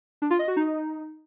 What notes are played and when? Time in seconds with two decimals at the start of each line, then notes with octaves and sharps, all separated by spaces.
0.22 D4
0.30 F4
0.39 D#5
0.48 F#4
0.56 D#4